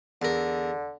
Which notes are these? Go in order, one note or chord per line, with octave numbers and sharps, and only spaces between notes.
E2 D3 A#4